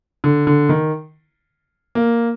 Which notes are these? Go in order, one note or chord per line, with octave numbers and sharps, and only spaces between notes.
D3
D3
D#3
A#3